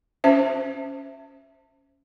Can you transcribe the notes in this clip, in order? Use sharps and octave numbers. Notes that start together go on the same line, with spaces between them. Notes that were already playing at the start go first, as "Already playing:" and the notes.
C#4 C5 E5